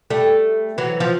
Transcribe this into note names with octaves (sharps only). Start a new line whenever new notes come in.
G3 A3
E3 F#3
F3